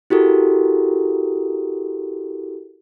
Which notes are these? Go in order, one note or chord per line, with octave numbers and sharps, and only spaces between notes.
E4 F#4 G4 A4 A#4